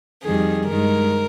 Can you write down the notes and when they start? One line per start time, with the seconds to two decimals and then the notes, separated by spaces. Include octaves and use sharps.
0.23 F2 D#3 G3 G#4
0.67 G2 D#3 G#3 A#4